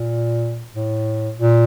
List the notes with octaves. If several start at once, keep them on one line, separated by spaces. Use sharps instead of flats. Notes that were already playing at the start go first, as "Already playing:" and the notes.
Already playing: A#2
A2
A#2